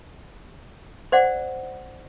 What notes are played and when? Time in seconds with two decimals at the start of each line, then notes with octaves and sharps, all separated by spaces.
1.12 C5 D5 F#5